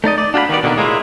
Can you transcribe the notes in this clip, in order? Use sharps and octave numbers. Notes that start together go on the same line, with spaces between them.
A3 D#4 D5 D#5
D5
D4 F#4 F5 G5 B5
D#3 G3 B3 D5
B2 D3 D#3 G3 A#3
A2 G#3 A#3 E4 F4